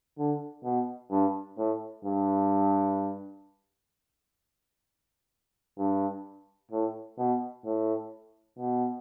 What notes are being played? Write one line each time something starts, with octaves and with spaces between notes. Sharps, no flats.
D3
B2
G2
A2
G2
G2
A2
B2
A2
B2